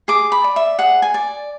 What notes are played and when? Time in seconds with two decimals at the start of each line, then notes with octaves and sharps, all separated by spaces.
0.08 G#4 D6
0.32 B5
0.44 D5
0.56 E5
0.79 G#4 F#5
1.02 G#5
1.14 D5